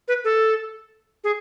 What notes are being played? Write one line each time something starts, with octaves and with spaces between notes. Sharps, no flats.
B4
A4
G#4